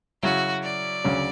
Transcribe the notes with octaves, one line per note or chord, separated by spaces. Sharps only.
C#3 F#3 C#4 E4 F#4
D5
D2 C#3 F#3 C#4